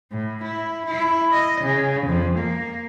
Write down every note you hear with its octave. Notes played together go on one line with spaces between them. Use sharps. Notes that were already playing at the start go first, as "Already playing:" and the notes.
A2
E4
E4
D#5
C#3
F2
A#3